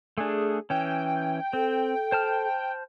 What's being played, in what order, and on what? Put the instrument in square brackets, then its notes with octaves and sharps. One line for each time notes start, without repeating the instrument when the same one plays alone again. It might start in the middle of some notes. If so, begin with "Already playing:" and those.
[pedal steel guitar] A3 D4 [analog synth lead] G#4
[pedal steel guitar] E3 C#4 [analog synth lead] G5
[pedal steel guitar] C4 [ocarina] A4
[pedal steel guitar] C5 A5 F6